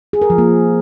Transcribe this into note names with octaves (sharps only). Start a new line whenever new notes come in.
G#4
A#4
F3
A#3